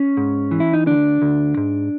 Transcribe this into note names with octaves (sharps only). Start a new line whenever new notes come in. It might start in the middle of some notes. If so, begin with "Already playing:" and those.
Already playing: C#4
G#2
E3
E4
D#4
D2 D4
D2
G#2